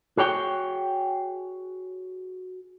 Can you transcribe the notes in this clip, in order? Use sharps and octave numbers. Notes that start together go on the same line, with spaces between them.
F#4 G#4 C#5 G5